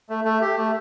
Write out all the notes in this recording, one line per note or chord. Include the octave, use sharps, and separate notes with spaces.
A3
A3
G4
A3